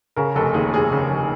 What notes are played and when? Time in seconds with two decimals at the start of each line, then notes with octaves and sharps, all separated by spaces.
0.16 C#3 A#4
0.36 F1 A4
0.54 D#2 G#4
0.74 F1 G#4
0.92 C#3
1.10 F1